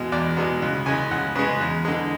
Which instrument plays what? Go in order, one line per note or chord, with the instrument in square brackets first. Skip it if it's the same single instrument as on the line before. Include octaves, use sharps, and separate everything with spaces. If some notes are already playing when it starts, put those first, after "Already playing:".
Already playing: [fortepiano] E2 B2 G#3
E2 D5
B2 G#3
C#2
C#3 G#3 G#5
C#2 F#5
C#3 G#3 B4
E2
D3 G#3